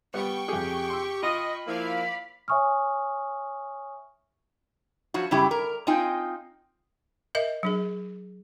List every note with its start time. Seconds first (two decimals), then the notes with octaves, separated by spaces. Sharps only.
0.14 G3 B3 G5 C#6
0.48 F2 G4 G#4
0.90 C6 E6
1.23 F4 D#5 B5
1.67 F3 A#3 E4 D5 F5
2.48 C#5 E5 G#5 C#6 D#6 F6
5.14 F3 F#3 F#4
5.31 F#2 C#3 G3 E4 G4
5.51 A#4
5.87 C4 D#4 F4 D#5 G5 G#5
7.35 A#4 D#5 E5
7.63 F#3 D4 G#4